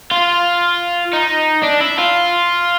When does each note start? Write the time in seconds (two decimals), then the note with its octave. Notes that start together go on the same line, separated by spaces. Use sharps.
0.11 F4
1.13 D#4
1.64 D4
1.81 E4
1.99 F4